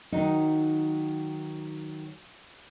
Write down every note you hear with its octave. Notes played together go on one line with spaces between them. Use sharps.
D#3 F#3 D#4